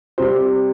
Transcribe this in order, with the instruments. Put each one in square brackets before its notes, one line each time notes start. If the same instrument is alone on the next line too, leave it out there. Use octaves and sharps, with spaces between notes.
[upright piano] C3 G3 C5